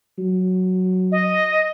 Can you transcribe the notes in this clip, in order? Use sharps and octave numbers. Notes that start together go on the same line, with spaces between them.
F#3
D#5